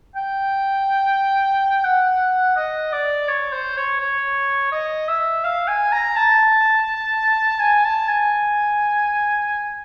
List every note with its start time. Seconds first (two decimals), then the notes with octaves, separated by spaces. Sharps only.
0.16 G5
1.84 F#5
2.56 D#5
2.92 D5
3.28 C#5
3.53 C5
3.77 C#5
4.00 C#5
4.72 D#5
5.08 E5
5.44 F5
5.68 G#5
5.92 A#5
6.16 A5
7.60 G#5
7.84 A5
8.08 G#5